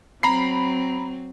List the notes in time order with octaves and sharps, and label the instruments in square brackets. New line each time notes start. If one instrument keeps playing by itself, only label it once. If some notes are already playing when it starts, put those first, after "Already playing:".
[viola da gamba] F#3 C4 [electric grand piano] A#5 B5 C7